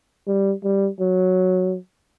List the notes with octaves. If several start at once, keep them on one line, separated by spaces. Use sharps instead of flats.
G3
G3
F#3